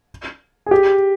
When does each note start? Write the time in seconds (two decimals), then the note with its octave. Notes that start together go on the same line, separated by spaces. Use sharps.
0.66 G#4
0.71 G4